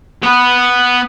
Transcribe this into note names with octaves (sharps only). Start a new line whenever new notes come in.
B3 B4